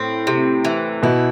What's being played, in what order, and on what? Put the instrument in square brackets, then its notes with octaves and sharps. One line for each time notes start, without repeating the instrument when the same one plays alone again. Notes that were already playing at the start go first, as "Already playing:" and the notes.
Already playing: [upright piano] A2 [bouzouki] C4
[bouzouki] C3
E3
[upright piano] B2 [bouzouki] E4